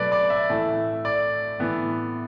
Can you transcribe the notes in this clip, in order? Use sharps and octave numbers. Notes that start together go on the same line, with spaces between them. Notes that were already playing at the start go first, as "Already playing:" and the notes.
Already playing: B2 F#3 A3 B4 D5
D5
E5
A2 E3 A3
D5
A2 E3 B3